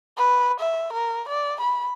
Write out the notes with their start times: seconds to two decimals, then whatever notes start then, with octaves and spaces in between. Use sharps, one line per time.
0.17 B4
0.60 E5
0.93 A#4
1.29 D5
1.61 B5